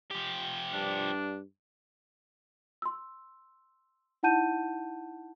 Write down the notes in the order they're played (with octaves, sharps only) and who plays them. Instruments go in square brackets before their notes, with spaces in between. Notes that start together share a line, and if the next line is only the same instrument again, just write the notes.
[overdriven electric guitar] F3 G4
[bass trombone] G2 [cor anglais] D4
[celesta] C6 E6
D#4 E4 F#5 A5 G6 D#7